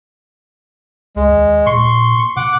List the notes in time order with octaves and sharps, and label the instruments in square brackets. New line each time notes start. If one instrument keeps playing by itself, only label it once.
[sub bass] C#2 [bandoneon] G#3
[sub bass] D#2
[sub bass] A#2 [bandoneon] C6 C#6
[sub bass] B2 [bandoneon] F#5 D6